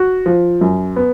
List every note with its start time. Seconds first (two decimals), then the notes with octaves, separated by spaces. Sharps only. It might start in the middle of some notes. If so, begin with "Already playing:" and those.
Already playing: F#4
0.26 F3
0.61 F#2
0.96 B3